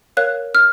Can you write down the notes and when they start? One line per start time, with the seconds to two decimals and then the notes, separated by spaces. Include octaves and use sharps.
0.17 A#4 C#5 F5 F#6
0.55 F6